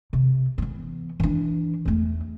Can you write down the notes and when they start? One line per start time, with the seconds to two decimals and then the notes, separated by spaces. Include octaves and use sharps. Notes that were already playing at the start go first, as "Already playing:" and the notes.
0.13 C3
0.58 E3 B3
1.20 E3 D4
1.85 E2 A3